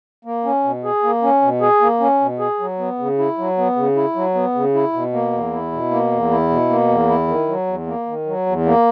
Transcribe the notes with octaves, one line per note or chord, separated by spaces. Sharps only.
A#3
C#4
B2
G#4
A#3
C#4
B2
G#4
A#3
C#4
B2
G#4
F#3
B3
C#3
E4
F#3
B3
C#3
E4
F#3
B3
C#3
E4
B2
A#3
E2
E4
B2
A#3
E2
E4
B2
A#3
E2
E4
D#3
F#3
E2
A#3
D#3
F#3
E2
A#3